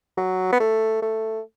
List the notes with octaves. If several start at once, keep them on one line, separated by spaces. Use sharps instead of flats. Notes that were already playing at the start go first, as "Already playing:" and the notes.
F#3
B3
A3
A3